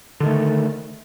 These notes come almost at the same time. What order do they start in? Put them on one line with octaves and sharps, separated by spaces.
D3 D#3 A3